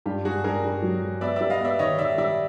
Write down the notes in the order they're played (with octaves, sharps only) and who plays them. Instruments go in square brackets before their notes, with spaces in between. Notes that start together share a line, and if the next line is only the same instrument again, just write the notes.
[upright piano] G2 [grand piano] F4 G4
[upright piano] G2 [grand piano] F#4 G#4
[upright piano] G2 [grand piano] G#4 A#4
[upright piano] G2
F#3
F#3
[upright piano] B3 [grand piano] D5 E5
[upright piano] G3 [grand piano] D5 E5
[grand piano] D#5 F5
[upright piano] B3 [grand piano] D5 E5
[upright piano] D#3 [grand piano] C#5 D#5
[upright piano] D#3 [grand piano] D5 E5
[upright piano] G3 [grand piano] D5 E5